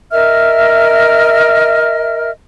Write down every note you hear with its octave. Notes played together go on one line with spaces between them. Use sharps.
A#4 D#5 E5 F6